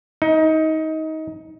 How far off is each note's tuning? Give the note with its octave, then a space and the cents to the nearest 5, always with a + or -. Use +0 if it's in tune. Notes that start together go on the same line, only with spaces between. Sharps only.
D#4 +25